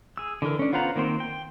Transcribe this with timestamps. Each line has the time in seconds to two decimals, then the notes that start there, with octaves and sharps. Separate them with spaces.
0.17 G#4 E6
0.42 D3 E3 A4 A#4
0.59 C#4 D4
0.73 B3 F4 C5 F#5 A#5
0.96 D#3 A#3 C4 C5
1.20 G5